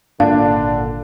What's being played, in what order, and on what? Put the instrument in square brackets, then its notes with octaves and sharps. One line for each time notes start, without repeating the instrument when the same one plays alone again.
[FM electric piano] G#1 A#2 [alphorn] D3 [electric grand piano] D4 [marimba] F5